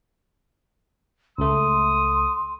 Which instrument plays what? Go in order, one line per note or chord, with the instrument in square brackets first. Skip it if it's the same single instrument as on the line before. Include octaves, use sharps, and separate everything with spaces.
[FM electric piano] C#2 A3 [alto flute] C6 [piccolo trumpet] D#6